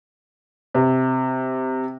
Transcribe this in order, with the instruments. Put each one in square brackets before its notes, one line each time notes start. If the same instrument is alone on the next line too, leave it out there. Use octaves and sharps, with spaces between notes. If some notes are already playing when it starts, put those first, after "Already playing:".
[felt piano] C3